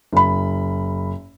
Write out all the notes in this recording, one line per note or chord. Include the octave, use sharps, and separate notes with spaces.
F#1 B5